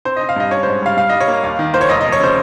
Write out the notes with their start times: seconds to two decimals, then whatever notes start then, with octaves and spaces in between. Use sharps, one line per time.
0.05 C4 C5
0.16 C4 D#5
0.29 F5
0.36 G2 D#5
0.51 C#4 C#5
0.63 G#2 C5
0.82 G3 F5
0.97 G2 F5
1.09 G3 D#5
1.20 C#5
1.28 A#3
1.44 D#2 F5
1.59 D#3
1.74 A#3 C5
1.81 C#5
1.89 F1 D#5
2.01 F2 D#5
2.12 C#5
2.20 C#3 C5